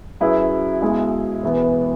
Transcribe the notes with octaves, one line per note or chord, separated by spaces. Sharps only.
F#2 F#3 E4 G#4 B4
B1 B2 G#3 E4
E1 E2 E3 B3